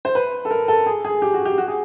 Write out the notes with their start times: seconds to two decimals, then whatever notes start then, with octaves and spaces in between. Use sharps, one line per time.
0.05 C5
0.15 B4
0.45 A4
0.51 A#4
0.68 A4
0.86 G#4
1.05 G#4
1.22 G4
1.34 F#4
1.45 G4
1.58 F#4
1.68 G#4